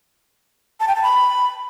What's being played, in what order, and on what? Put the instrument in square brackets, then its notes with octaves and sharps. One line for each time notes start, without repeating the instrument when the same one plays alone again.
[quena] A5
G5
A5
B5